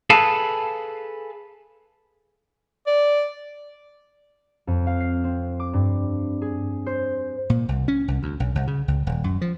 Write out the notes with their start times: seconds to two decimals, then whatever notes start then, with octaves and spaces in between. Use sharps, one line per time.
0.10 G#4 A4 B4 F5 A5
2.87 D5
4.67 F2
4.87 F5
5.00 C7
5.24 C4
5.60 D6
5.73 G2
6.42 G#4
6.86 C5
7.50 A#2
7.69 C2
7.88 C#4
8.08 C2
8.23 D2
8.40 B1
8.55 C2
8.67 C#3
8.88 C#2
9.07 D#1
9.24 F#2
9.41 F3